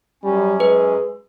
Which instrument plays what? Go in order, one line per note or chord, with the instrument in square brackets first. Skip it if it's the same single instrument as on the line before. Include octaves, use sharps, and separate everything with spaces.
[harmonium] F#2 C#4 [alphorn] G3
[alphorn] G#3 [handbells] B4